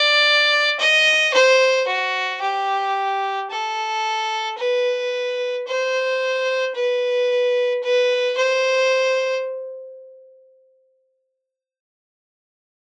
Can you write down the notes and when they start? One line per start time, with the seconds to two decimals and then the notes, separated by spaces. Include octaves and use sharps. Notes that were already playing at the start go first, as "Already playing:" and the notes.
Already playing: D5
0.79 D#5
1.34 C5
1.87 F#4
2.42 G4
3.51 A4
4.58 B4
5.67 C5
6.75 B4
7.83 B4
8.37 C5